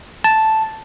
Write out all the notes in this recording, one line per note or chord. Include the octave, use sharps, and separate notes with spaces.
A5